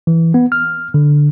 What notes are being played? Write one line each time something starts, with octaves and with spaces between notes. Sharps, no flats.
E3
B3
F6
D3